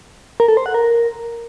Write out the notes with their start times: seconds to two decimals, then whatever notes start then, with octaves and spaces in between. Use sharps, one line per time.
0.40 A#4
0.48 A4
0.57 C5
0.66 F#5
0.74 A#4